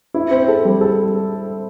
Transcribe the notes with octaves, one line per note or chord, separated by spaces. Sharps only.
E4
C4
A4
G3
A4